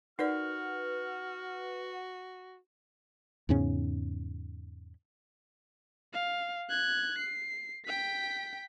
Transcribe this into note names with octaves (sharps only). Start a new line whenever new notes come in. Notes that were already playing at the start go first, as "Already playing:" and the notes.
D#4 F#4 A#4 B4 D5 F#5 F6
E2 G#2 C#3 C#4
F5
F#6 G#6
C7
G5 B6